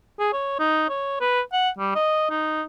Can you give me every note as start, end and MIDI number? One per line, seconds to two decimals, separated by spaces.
0.19 0.31 68
0.33 0.58 73
0.59 0.85 63
0.89 1.20 73
1.21 1.41 71
1.52 1.70 78
1.78 1.93 55
1.95 2.30 75
2.30 2.63 63